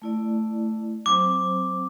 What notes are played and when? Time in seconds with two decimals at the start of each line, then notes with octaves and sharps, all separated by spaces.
0.02 A3 E4 D5
1.06 F#3 C4 C5 D6